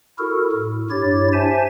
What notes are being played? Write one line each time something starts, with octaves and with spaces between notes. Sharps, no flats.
E4 F#4 A4 A#4
A2
G2 E4 G4 C#5 A6
C5 E5 G#5 A5